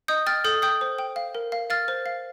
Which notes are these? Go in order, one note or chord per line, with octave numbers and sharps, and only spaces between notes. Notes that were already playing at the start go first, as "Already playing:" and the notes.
D#5 D#6 G6
G5 F6 A6
A4 D#6 G6
G5 D#6 G6
C5
G5
F5
A#4
F5
F5 F6 A6
C5
F5